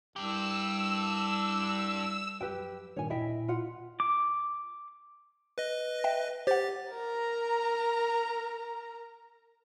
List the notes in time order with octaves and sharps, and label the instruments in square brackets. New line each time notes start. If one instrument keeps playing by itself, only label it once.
[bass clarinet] C2 [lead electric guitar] D4 G4 [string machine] E6
[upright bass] F#2 F3 [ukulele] G4 B4 G5
[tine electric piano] G2 A#2 D#3 [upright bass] E4 [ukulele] C#5 G#5
[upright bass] D#1 A#2 [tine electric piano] E4 [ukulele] D#5 E5 G5
[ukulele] F4 F#5
[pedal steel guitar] D6
[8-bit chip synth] B4 D#5
[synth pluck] E5 G5
[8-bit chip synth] G4 A6 [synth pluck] C5 F#5
[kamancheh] A#4 A#5